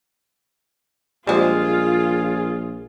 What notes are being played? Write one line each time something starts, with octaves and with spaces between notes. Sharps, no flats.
A#1 G3 G#3 F4 G#4 C5